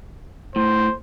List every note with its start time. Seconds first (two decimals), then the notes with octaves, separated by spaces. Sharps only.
0.56 A2 C5